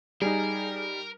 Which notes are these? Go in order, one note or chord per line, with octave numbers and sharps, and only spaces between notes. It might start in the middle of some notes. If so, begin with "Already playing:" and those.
G3 D#4 G#4 A#4